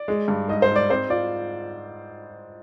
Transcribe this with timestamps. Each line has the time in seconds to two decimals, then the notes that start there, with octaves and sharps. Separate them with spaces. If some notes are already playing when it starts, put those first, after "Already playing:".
Already playing: D5
0.08 G#3
0.28 G2
0.48 G#2 D#5
0.62 C5
0.69 G#2
0.76 D5
0.90 C4 C5
1.10 F4 D5